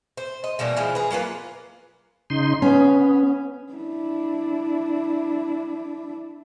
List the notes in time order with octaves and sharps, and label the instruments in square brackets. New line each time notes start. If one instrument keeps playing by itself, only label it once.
[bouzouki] C5
D#5
B2 E3 G3 A#3
E3 F3 G#3
G#4 B4
F#3 A#3 F4 B4
[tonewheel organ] C#3 D#4 C6
[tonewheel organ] B3 [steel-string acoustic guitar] C#4
[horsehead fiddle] D4 E4